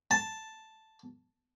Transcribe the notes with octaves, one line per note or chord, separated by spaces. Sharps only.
A5